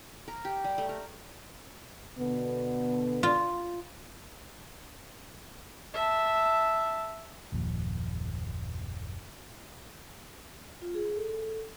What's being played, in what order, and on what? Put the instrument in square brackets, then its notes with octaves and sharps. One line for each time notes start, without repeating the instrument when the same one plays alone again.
[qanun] A#4
G4
G3
A3
A#4
[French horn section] B2 D3 B3
[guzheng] F4
[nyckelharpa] E5 A5
[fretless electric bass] F#1 D#2 A#2 F3
[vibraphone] F4
G#4
A4